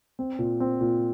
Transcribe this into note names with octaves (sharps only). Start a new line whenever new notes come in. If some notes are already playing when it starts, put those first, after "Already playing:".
C4
A#2
C4
A#2